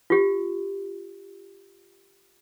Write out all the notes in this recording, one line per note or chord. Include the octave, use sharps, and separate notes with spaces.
F4 G4